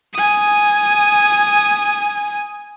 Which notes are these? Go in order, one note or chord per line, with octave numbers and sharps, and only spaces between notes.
G#5 D#6